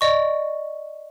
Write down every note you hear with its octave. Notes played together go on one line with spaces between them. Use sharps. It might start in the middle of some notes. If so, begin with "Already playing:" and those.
D5 D#5 C#6